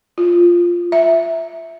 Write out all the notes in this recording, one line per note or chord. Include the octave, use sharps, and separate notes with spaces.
F4
E5